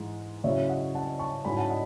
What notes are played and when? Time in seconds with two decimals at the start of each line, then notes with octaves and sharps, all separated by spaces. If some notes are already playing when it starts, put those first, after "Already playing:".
Already playing: G#2 E3 G#3
0.44 C#3 F#3 C#4 E4 C#5 E5
0.69 D#5 F#5
0.95 F#5 A5
1.19 A5 C#6
1.45 G#2 F#3 C#4 E4 G#5 B5
1.57 F#5 A5
1.70 D#5 F#5